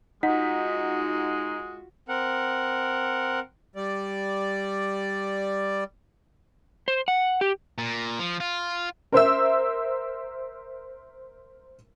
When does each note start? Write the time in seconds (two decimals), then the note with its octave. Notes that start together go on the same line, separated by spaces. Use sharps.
0.23 G#3 D#4 F4 F#4 F#5 B6
2.08 C4 A#4 F#5
3.76 G3 D5
6.88 C5
7.08 F#5
7.41 G4
7.78 A#2
8.19 F3
8.40 F4
9.12 A#4 C5 E5 E6